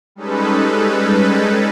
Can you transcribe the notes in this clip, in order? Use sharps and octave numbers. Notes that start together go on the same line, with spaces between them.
G3 G#3 C#4 D#4 A4 B4